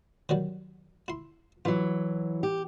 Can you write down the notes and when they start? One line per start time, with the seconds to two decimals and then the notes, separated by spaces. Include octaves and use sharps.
0.29 D#3 F#3 G3
1.08 E4 C6
1.65 E3 F#3 F4
2.43 G4